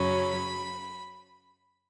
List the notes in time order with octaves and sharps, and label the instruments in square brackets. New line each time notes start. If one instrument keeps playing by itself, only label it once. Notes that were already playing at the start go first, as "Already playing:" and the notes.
Already playing: [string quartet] F#2 C#3 F#3 C#4 B5